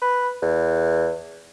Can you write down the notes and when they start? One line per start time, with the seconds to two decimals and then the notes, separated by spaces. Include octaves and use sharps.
0.02 B4
0.42 E2